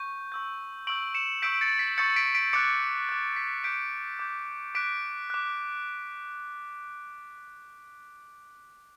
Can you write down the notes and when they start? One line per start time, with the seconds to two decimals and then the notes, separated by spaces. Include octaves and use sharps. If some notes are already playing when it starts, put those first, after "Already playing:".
Already playing: C#6 G6
0.32 C#6 E6 G6
0.87 C#6 E6 G6 D7 F#7
1.14 C#7 E7
1.42 C#6 E6 G6 B6 D7
1.54 D7
1.61 A6 C#7
1.79 B6
1.98 C#6 E6 G6 A6 C#7
2.16 B6 D7
2.35 B6 D7
2.53 D6 F#6 A6 C#7
3.09 D6 F#6
3.36 B6
3.64 D6 G6 B6 D7
4.19 D6 G6
4.75 D6 F#6 B6 D7
5.30 D6 F#6